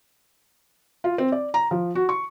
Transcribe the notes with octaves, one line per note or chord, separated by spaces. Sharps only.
F4
C4
D5
A#5
F3
F#4
C#6